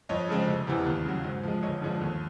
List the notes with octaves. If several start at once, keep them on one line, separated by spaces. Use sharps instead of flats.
F2 C#5 D#5
C#3 F3 G#3 C4
F1
E2 C3 E3
D#2
C#3 F#3
G#2
F3 G#3
G1 C#5 D#5
G2 D3 F3 G#3
D#2